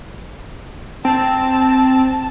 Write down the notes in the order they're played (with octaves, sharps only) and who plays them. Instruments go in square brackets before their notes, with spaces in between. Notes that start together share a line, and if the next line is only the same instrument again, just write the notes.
[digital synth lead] C4 [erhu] A5